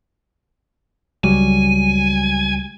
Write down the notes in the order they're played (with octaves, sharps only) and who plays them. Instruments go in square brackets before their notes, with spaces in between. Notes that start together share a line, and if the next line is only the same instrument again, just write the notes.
[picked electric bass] C#2 F#3 G3 [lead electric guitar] G#5